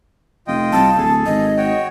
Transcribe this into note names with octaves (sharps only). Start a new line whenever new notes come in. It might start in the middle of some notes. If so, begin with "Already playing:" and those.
F1 F4 D#5 G5
C2 A5
D1 G#4 A4
G#1 D#5
F#4 C#5 G5